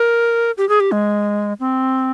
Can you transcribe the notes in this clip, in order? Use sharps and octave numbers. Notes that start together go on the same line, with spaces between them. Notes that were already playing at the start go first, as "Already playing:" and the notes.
Already playing: A#4
G4
G#4
G4
G#3
C4